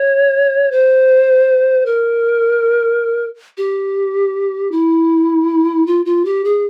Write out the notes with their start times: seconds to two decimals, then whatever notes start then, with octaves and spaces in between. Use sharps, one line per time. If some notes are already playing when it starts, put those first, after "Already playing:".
Already playing: C#5
0.72 C5
1.86 A#4
3.58 G4
4.72 E4
5.87 F4
6.06 F4
6.25 G4
6.45 G#4